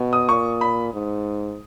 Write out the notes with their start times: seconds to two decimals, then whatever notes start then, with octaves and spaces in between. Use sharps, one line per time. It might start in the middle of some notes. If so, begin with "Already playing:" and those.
Already playing: B2
0.13 D#6
0.29 A#2 C#6
0.61 B5
0.93 G#2